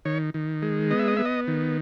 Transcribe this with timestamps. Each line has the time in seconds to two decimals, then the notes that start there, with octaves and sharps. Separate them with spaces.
0.05 D#3 C#5
0.34 D#3
0.62 G#3
0.91 B3 D#5
0.99 E5
1.08 D#5
1.17 B3 E5
1.25 D#5
1.48 D#3